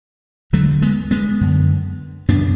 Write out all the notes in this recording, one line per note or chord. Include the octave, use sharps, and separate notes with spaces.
E2 D3 F#3 A3
G#3 B3
G#3 B3
F#2 D3
F#2 C#3 B3 D4